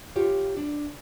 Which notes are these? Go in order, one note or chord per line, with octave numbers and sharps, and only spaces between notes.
F4 G4 C#5
D4